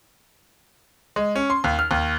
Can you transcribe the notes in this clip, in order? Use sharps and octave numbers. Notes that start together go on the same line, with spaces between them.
G#3
C#4
C6
D#2
F6
D#2